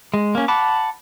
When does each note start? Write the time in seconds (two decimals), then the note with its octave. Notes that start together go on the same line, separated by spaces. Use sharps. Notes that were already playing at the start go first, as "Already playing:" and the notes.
0.14 G#3
0.35 A#3 C#4
0.48 F#5 A5 B5 D6